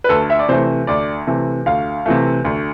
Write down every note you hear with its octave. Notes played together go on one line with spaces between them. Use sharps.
B4
D2 A4
E5
D5
C3 E3 A3 C5
D2 D5
C3 E3 A3
D2 F5
C3 E3 A3
D2